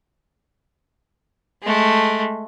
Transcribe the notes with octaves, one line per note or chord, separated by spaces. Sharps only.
G#3 A3